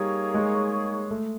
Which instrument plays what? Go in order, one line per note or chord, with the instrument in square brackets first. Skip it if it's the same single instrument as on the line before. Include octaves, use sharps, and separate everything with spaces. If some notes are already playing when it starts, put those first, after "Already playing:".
Already playing: [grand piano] G3 [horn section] A#3 D#4 G#4 C#5
[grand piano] G#3
A3